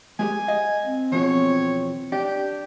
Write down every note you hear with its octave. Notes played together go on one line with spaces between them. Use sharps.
G#3 G4 G#4 G#5
D#5 F5
C4
E2 B2 F3 C#5
D4 G4